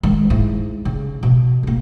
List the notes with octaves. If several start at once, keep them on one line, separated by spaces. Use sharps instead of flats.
D#3 G#3
G#2 E4
C#3
B2
B2 A#3